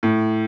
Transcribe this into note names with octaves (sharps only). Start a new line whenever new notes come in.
A2